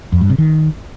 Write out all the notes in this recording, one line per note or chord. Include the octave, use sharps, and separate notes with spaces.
F2
G2
C3
D#3